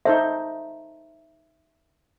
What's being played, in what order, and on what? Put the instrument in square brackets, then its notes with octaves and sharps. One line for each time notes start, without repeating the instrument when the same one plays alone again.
[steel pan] D#4 A4 C5 [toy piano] E5